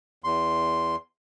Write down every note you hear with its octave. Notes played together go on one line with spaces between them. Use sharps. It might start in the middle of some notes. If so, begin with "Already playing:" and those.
E2 C6